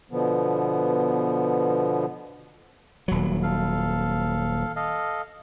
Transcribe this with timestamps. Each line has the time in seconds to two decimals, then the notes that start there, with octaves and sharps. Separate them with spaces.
0.11 B2 D3 F3 B3
3.08 D#1 F#3
3.43 A4 F5
4.76 A4 D#5 F5